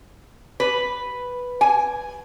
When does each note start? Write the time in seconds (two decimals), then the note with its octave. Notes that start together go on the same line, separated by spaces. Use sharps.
0.60 B4
1.61 G#5